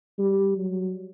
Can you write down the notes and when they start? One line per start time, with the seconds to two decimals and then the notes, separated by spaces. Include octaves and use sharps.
0.18 G3
0.57 F#3